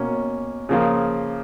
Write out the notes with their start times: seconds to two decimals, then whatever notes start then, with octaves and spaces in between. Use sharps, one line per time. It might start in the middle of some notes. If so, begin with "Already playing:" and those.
Already playing: B2 A#3 C#4
0.69 C#3 F3 A#3 F4